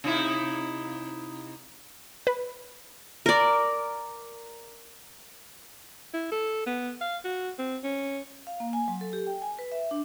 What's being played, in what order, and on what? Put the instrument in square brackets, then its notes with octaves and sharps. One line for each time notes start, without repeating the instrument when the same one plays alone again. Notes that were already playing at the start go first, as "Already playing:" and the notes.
[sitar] C3 D#4 E4
[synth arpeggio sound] B4
[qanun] A#4 D5
[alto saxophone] E4
A4
B3
F5
F#4
C4
C#4
[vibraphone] F5
A#3
G#5
F#3
A4
G4
G5
G#5
B4
E5
D4